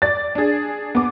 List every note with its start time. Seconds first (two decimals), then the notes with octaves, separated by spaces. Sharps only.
0.02 D5 A6
0.35 D4 G#4
0.95 B3 D6